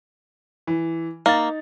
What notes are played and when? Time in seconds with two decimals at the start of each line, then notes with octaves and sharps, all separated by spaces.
0.67 E3
1.26 A#3 D#4 A6